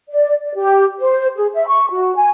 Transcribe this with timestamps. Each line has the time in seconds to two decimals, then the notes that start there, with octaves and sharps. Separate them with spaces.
0.10 D5
0.43 D5
0.56 G4
1.00 C5
1.36 G#4
1.54 E5
1.68 C#6
1.91 F#4
2.16 G#5